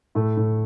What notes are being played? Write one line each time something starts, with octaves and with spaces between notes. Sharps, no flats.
A2 A3
A2